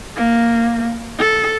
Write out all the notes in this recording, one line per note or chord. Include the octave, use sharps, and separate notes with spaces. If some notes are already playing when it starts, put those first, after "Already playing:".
A#3
A4